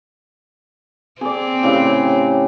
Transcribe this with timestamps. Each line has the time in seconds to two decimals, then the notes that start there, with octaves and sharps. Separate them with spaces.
1.21 C4 G#4 D5
1.63 A2 C#3 G4